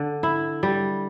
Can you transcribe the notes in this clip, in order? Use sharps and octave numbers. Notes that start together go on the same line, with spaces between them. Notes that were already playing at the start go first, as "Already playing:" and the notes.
Already playing: D3
E4
G3